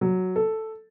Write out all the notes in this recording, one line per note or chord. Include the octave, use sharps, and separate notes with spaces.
F#3
A4